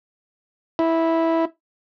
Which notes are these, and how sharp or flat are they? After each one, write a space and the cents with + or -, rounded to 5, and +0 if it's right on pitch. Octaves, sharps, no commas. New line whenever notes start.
E4 -10